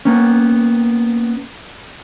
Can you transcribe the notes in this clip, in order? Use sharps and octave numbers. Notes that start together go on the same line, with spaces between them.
A#3 B3 C#4